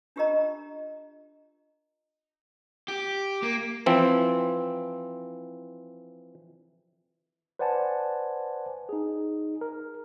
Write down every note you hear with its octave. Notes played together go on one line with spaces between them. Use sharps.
D4 F4 G4 A#4 D#5 A#5
G4
A#3
E3 F3 C4
B4 C5 D5 F#5 G#5 A5
D#4 G#4
A#4